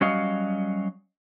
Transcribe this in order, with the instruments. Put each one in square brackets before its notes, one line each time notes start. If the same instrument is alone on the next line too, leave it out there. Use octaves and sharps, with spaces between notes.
[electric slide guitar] F#3 G3 C#4 F#4 D#5 F5